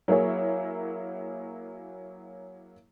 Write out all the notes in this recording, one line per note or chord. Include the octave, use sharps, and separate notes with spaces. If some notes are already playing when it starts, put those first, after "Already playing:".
F#3 A#3 E4 G#4 C#5